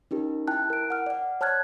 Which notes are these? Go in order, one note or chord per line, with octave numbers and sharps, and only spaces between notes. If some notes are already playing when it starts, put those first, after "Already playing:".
C#4 D#4 G4 A#4
E4 G5 A5 F#6
A#4 D7
F#5 F6
D5 F#5
C#5 A5 F6 F#6 G#6